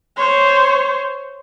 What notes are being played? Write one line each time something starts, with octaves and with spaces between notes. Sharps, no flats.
C5 C#5